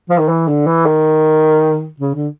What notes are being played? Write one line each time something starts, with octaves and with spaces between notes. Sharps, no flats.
F3
D#3
E3
D3
E3
D#3
C#3
D3